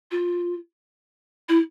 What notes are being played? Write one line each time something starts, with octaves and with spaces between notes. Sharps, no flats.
F4
E4